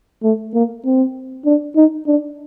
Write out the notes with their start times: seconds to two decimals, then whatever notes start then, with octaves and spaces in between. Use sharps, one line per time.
0.23 A3
0.54 A#3
0.85 C4
1.45 D4
1.76 D#4
2.07 D4